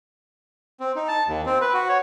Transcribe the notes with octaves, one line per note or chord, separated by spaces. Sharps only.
C4
D#4
A5
D#2
C4
B4
F#4
C#5